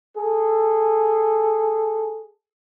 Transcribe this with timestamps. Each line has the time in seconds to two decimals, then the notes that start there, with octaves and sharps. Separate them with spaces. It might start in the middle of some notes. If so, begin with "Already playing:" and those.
0.17 G#4 A4